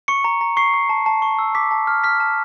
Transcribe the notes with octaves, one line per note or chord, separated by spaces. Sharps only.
C#6 C#7
A#5
A#5
C#6 C7
C#6
A5
A5
C#6
E6
D6 B6
A5
F6
F6 B6
A5